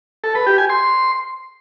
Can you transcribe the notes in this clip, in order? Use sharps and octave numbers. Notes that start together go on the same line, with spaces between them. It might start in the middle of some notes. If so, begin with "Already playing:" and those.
A4
B4
G4
G#5
C6